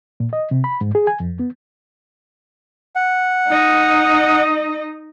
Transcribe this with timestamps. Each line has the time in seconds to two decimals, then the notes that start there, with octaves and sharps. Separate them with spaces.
0.20 A#2
0.33 D#5
0.51 C3
0.64 B5
0.81 G#2
0.95 G#4
1.07 G#5
1.20 F2
1.39 B3
2.96 F#5
3.47 D#4 D#5